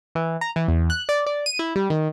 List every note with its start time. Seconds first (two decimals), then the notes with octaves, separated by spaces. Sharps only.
0.15 E3
0.41 A#5
0.56 E3
0.68 E2
0.90 F#6
1.09 D5
1.26 D5
1.46 D#7
1.59 E4
1.76 G3
1.90 D#3